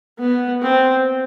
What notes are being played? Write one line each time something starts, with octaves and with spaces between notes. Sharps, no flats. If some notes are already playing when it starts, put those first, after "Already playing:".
B3
C4